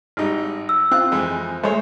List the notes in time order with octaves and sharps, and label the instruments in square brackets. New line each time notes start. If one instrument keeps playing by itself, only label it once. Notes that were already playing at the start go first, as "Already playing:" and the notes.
[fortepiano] G#1 G3 D#4
[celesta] E6
[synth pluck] C4 [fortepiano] F4 F#6
[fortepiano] F2 E3 G#3
[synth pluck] G#3 A3 [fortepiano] C5 C#5